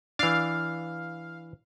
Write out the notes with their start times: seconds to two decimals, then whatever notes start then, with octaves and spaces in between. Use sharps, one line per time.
0.19 E3 D4 F5